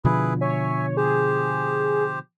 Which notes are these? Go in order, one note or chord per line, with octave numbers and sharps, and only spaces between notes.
B2 D3 F3 E4 G#4 B4
C#5 E5 G#5
G4 G#4 C5